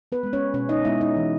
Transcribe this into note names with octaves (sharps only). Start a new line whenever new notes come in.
B3 B4
G#3 B3
C#4 C#5
B2 C#4 C#5
D#4 D#5
G#3 B3 E4 E5
D#4 D#5
E3